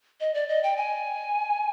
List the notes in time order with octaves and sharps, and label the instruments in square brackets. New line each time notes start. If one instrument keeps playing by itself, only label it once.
[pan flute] D#5
D5
D#5
G5
G#5